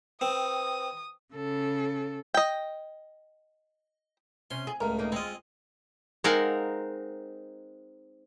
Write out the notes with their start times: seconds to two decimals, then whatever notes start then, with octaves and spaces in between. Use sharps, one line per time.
0.21 C4 B4 G5 D#6
1.34 C#3 A4
2.34 D#5 G5
4.51 C3 C#4 C6
4.67 G#4
4.81 C#2 A2 A#4
4.99 A#3 D#4 D#5
5.12 G#3 C4 F4 D#5
6.24 G#3 C4 D#4 A#4 F5 F#5